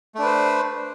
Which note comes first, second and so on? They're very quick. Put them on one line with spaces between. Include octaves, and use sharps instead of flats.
A3 D4 B4 C5